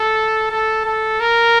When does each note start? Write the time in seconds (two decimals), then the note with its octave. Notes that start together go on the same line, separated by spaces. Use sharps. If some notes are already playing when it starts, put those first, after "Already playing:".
Already playing: A4
0.51 A4
0.85 A4
1.20 A#4